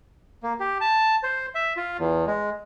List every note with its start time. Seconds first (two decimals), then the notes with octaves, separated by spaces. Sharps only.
0.43 A#3
0.60 G4
0.81 A5
1.23 C5
1.55 E5
1.77 F4
1.99 E2
2.27 G#3